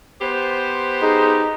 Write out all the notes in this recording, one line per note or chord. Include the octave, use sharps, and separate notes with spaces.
B3 G4 C5
D#4 G#4